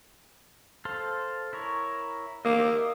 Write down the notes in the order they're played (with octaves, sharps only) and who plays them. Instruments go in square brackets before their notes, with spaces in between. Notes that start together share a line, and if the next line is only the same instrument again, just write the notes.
[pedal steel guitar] A4 C5 F5
E4 A#4 C#5
[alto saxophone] A#3 [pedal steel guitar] D#5 E5 D6